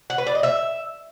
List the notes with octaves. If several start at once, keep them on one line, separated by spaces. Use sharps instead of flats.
F#5
B4
D5
D#5
E5